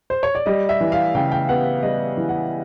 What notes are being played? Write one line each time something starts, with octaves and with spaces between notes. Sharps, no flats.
C5
C#5
D5
G3 D#5
E5
E3
F5
C#3 G5
G5
B3 F#5
G3 D#5
E3
F#5